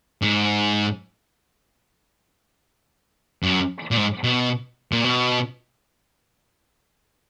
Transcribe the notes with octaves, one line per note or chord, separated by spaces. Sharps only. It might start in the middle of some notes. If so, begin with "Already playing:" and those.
G#2
F#2
A#2
G#2
B2
A#2
B2